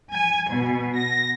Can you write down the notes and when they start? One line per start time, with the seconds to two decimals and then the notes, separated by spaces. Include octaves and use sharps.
0.12 G#5
0.49 B2
0.97 A#6